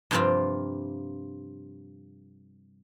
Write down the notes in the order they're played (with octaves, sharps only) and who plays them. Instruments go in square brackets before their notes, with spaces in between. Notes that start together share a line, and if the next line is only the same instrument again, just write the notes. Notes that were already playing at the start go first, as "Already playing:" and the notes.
[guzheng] G2 C3 F3 A#3 C4 F4